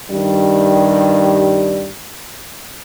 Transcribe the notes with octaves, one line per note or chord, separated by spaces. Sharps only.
G2 D#3 G3